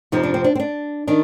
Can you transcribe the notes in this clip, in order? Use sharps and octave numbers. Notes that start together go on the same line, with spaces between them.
F2 C3 F3 D#4
D4
C4
D4
C4
D4
D#3 D4